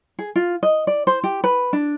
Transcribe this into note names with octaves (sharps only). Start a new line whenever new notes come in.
G#4
F4
D#5
D5
C5
G4
B4
D4